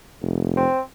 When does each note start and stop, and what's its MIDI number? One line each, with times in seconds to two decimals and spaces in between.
0.22 0.65 29
0.57 0.80 60